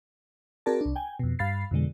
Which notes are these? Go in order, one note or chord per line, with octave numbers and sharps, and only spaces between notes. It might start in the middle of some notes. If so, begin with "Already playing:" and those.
C4 F#4 G#4 A#4 D5 A5
C2 D4
G5 G#5
F2 B2
G2 F5 B5 A6 C7
F2 B2 D3 G#3